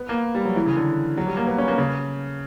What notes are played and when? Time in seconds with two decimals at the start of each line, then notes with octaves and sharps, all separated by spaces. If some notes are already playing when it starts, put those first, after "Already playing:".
Already playing: B3
0.09 A#3
0.35 G3
0.45 F#3
0.56 E3
0.66 C#3
0.76 D3
1.17 F#3
1.27 G3
1.37 A#3
1.47 B3
1.58 C#4
1.68 A#3
1.78 C#3